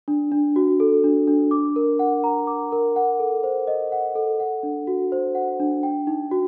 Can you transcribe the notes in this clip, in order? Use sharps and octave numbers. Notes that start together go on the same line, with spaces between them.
D4
D4
F#4
A4
D4
D4
D6
A#4
F#5
A#5
D6
A#4
F#5
A4
C5
D#5
F#5
A4
F#5
D4
F#4
C5
F#5
D4
G5
D#4
F#4